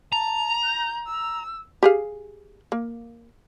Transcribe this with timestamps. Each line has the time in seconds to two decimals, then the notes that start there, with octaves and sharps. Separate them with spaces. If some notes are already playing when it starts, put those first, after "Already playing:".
0.12 A5 A#5
0.65 G6
1.07 E6
1.83 G4 G#4 F5
2.72 A#3